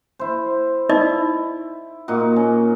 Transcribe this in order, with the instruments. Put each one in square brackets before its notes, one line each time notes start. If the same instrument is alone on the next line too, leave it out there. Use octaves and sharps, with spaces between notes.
[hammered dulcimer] E4 C5
[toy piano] D#4 D5 D#5 [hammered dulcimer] E4
[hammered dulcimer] A#2 D#4 F#4
C#4